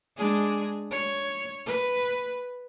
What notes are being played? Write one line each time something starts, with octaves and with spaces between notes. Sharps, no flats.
G#3 D4 G#4
C#5
B4